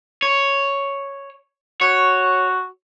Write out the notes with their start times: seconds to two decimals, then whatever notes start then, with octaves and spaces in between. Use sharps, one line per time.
0.23 C#5
1.81 F#4 C#5